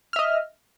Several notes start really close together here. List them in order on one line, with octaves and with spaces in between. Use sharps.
F6 E5 D#5